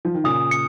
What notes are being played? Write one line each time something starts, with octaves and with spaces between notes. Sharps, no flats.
F3
D#3
A#2 C#3 D#6
C#7